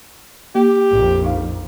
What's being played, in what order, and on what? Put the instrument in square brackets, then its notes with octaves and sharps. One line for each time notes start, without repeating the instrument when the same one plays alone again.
[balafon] A#3 [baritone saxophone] G4
[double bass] A#1 F2
[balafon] D#4 F5